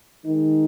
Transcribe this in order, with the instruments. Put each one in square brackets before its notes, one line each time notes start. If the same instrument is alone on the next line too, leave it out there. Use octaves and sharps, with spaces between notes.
[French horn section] D#3 G#3 D#4